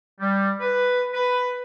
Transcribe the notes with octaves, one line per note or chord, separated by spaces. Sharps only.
G3
B4
B4